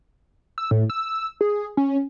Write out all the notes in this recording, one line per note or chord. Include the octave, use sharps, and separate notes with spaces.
E6
A2
E6
G#4
C#4